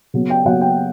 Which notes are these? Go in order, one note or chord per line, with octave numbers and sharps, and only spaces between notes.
C#3 F#3 B3
G5
C#3 F#3 B3 F#5
G5